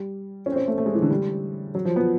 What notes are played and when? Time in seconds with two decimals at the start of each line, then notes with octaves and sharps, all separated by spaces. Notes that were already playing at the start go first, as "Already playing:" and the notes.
Already playing: G3
0.46 C#4
0.52 C4
0.56 C#4
0.68 A3
0.78 A3
0.86 G#3
0.94 E3
1.02 D3
1.10 G3
1.75 F#3
1.85 F3
1.96 B3